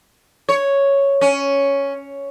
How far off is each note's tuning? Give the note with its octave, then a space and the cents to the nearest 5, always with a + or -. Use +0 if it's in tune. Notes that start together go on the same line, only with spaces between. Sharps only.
C#5 +0
C#4 +5